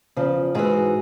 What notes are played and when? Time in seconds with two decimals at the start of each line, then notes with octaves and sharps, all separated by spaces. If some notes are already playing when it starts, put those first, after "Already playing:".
0.16 E2 C#3 F3
0.55 G#2 E3 F#4 G#4